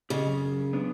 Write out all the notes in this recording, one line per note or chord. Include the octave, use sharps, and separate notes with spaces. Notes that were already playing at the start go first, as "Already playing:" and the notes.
C#3 G4 D5 D#5
F#2
B3 D4